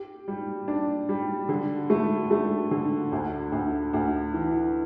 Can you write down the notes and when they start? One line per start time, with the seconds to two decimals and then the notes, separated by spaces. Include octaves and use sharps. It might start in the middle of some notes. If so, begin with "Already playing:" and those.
Already playing: G4
0.28 G3
0.68 D4
1.09 G3
1.49 D3
1.90 A3
2.31 A3
2.71 D3
3.12 D2
3.52 D2
3.93 D2
4.34 E3